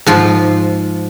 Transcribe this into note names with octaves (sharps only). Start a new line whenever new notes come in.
G#2 F3 F4